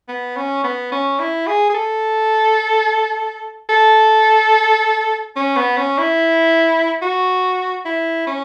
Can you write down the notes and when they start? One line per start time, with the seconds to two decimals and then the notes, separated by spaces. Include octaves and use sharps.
0.09 B3
0.37 C#4
0.64 B3
0.92 C#4
1.19 E4
1.47 G#4
1.70 G#4
1.75 A4
3.69 A4
5.36 C#4
5.57 B3
5.78 C#4
5.98 E4
7.02 F#4
7.85 E4
8.27 C#4